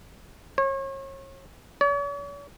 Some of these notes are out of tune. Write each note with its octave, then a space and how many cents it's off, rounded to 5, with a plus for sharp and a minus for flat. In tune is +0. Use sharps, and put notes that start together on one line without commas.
C#5 -35
C#5 +45